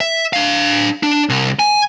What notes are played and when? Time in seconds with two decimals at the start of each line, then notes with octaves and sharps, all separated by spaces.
0.01 E5
0.33 D4 F5
1.03 D4
1.29 C2
1.59 G#5